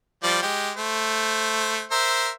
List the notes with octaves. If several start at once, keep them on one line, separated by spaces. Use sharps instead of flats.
F3 G3 D5
G#3 G4
A3 C5
A#4 C5 E5